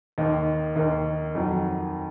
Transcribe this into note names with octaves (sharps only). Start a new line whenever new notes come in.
D#2 D#3 A#3 D#4
D#2 D#3 A#3 D#4
F2 D#3 F#3